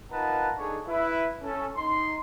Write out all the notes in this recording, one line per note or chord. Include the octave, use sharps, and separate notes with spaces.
D#4 F4 A#4 B4 F#5 A5
D4 D#4 G#4 A4 C#5
E4 B4 E5
C#4 A4
D#4 C6